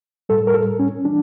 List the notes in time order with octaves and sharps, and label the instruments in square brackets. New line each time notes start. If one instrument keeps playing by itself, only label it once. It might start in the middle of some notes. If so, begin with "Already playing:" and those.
[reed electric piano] A2 G3 A4
A#4
A4
C#4
E3 G3 D4